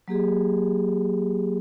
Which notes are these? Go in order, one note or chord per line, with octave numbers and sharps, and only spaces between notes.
F#3 A#3 G4 G#4